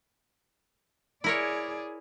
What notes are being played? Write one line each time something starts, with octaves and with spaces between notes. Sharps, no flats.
E4 G#4 A#4 C#5 D5